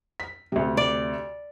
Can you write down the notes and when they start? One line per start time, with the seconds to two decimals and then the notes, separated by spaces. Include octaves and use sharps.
0.20 B6
0.52 D2 C3
0.77 D5